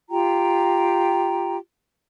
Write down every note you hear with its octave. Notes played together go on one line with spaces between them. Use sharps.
F4 G4 G5 A#5